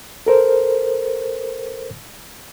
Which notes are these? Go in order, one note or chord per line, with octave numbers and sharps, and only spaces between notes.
A4 A#4 C5